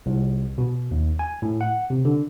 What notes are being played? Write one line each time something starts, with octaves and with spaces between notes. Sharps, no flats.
C2
B2
D#2
G#5
A2
F#5
C3
D3